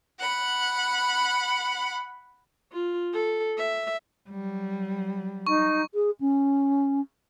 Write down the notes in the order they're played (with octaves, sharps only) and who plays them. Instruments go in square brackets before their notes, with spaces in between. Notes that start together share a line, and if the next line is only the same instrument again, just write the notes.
[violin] F#5 B5
[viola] F4
A4
E5
[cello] F#3 G3
[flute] D#4 [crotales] C#6
[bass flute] G#4
C#4